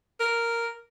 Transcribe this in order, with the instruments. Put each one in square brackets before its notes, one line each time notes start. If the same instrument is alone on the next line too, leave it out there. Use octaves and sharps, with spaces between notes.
[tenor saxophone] A#4